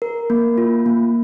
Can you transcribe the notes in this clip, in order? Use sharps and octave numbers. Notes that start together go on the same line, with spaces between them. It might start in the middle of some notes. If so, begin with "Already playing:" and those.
A#4
A#3
F4
A#3